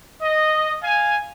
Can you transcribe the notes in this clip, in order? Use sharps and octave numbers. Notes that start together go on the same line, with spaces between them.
D#5
F5 G#5